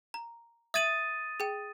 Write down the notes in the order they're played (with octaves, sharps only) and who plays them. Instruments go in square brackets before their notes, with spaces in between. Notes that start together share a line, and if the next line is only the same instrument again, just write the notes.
[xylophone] A#5
[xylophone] E5 G#6 F#7 [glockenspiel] D#6 A6 D#7
[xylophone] G#4 G5